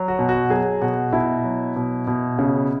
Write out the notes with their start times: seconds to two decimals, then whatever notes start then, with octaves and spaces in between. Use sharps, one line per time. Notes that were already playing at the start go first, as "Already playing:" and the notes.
Already playing: F#3
0.08 F#4
0.19 B2
0.29 F#4
0.50 F#3 G#4
0.81 B2 F#4
1.13 B2 E4
1.44 F#3
1.76 B2
2.07 B2
2.39 C#3